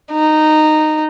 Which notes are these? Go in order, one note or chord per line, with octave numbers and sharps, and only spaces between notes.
D#4